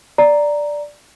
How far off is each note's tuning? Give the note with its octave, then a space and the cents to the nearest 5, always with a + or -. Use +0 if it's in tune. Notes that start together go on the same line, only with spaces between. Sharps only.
D5 +0 A#5 +0